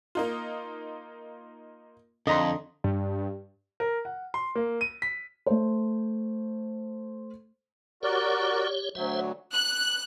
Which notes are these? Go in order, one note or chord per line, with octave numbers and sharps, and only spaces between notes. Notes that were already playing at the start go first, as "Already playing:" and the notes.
A#3 D#4 F4
F2 D3 D#5 A#5 C6
G2
A#4
F#5
C6
A#3
D#7
B6
A3 C5
F#4 G4 A#4 C#5 D5
D2 F#3 C5 E5
F#6